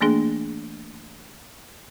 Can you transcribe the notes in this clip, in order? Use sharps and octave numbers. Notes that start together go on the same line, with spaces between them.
E3 A3 A#3 D4 G#4